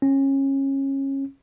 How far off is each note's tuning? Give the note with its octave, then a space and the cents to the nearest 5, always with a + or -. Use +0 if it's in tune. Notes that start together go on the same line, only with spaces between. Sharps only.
C#4 -25